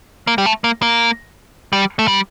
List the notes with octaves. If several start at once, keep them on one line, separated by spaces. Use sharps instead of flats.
A#3
G3
A3
A#3
A#3
G3
A3
G3